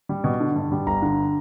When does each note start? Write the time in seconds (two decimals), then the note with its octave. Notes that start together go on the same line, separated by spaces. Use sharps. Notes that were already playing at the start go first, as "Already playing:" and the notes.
0.09 G3
0.24 B2
0.40 D3
0.56 G2
0.72 G3
0.86 G1 A#5
1.02 D3